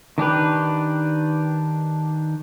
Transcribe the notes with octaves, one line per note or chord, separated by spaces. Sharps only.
D#3 D4 G4 B4